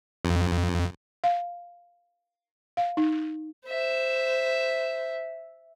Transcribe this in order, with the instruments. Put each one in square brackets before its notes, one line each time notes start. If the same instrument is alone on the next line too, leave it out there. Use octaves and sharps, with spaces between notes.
[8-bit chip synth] F2
[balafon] F5
F5
D#4
[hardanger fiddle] C5 E5